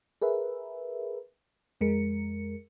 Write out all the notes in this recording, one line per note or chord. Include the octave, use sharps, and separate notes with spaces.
G#4 A#4 B4 E5
F2 G#3 A#4 C#7